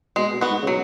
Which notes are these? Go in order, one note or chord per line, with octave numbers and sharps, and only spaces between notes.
B2 G#3
B2
B3 F#4
G#2
C#3
B2 F#3